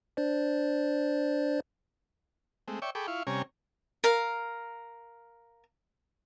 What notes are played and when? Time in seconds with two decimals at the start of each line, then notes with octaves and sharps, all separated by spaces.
0.17 D4 C5 D5
2.68 G#3 A3 C4
2.82 C#5 D5 E5 G5 C#6
2.95 G#4 A4 G5 B5 C#6 D6
3.07 E4 F4 F5 C#6
3.27 C3 G3 C#4 C#5 G#5 A#5
4.04 A#4 F5